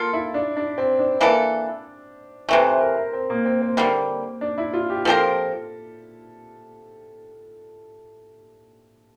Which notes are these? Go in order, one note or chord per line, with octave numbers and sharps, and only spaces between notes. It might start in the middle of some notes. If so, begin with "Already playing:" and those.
Already playing: A#3 F4 A4
E4
D4
D4
C4
D4
E3 A#3 E4 A4
C3 E3 A3
C5
A#4
A#4
C4
A#3
C4
C4
D3 G3 A#3
D4
E4
F4
G4
F3 C4 G4 A4 A#4